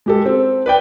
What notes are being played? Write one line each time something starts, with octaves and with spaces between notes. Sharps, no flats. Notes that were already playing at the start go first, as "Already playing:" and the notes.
G#3 G4 A4
C4
B4 D5 G5